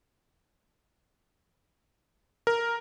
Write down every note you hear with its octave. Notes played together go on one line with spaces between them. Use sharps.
A#4